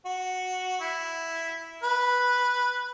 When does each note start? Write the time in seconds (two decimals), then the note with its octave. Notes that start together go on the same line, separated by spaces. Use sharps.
0.05 F#4
0.80 E4
1.83 B4